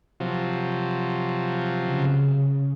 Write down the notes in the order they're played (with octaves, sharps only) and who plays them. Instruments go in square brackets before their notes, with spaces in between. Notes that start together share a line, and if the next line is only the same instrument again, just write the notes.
[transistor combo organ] C3 F3 F#3
[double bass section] C#3